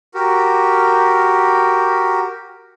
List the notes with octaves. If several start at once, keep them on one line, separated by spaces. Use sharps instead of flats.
F#4 G4 A#4